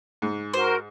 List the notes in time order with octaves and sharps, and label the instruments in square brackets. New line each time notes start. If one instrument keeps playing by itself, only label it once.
[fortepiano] G#2
[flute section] F#4 A#4 [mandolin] C5